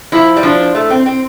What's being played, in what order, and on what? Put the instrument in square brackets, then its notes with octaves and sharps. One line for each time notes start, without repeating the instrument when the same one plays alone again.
[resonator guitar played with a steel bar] F3 [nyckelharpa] E4
[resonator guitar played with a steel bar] G3
[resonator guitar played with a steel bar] F3 [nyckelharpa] D4
[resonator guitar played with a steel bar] A3
C4
C4